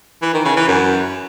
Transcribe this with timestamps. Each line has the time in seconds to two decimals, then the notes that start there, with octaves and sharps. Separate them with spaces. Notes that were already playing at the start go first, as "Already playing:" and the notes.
0.22 E3
0.34 D#3
0.45 C#3
0.57 E3
0.68 F#2